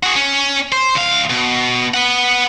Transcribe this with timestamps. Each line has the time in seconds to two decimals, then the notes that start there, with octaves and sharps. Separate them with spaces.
0.03 F#4 G#4
0.16 C#4
0.72 C5
0.95 D2 F5
1.30 B2
1.94 B4 F#5